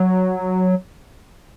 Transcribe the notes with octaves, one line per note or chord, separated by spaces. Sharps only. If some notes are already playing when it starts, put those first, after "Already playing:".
Already playing: F#3